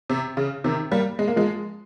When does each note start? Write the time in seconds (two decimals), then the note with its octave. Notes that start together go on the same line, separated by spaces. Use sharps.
0.10 C3
0.37 C#3
0.64 C3 D#3
0.91 G3 A#3
1.19 G#3
1.28 A#3
1.36 F3 G#3